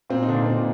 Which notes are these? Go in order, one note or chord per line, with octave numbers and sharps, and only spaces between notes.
A#2 C4
D#4
D3 D4
A#2
C4
A#2